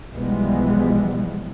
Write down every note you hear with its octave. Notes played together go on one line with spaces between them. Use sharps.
B1 E3 F3 G3 G#3 B3